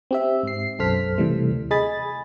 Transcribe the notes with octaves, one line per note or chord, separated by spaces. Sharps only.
C4 G4 E5
G#2 C7
B1 F#2 A4 C5 F6 B6
C3 E3 G3 A3
D2
G#4 D#5 G#5 B5 A6